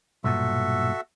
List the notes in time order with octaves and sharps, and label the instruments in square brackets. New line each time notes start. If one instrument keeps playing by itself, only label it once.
[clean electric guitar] B1 G2 A#2 [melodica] F#4 A4 E5